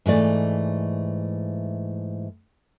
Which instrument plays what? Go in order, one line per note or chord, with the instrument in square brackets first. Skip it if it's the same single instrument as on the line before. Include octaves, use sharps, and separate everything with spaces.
[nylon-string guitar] G#2 E3 A3 D5